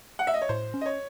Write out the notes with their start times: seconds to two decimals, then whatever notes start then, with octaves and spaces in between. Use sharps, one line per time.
0.19 F#5
0.27 E5
0.34 D#5
0.42 C#5
0.49 A2 C5
0.74 C#4
0.81 D#5
0.86 C#5